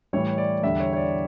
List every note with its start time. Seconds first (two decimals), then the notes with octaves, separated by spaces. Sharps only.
0.13 A2 E3 G3 C#5
0.38 D5
0.63 E2 D3 G3 E5
0.80 C#5
0.93 C#5
0.97 D5